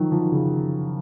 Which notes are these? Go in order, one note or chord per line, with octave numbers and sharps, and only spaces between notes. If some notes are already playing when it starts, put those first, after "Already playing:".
Already playing: D#3 F3 F#3
F3
D#3
C#3